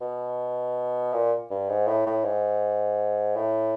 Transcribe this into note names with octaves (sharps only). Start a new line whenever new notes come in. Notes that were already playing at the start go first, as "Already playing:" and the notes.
B2
A#2
G2
G#2
A2
A2
G#2
A2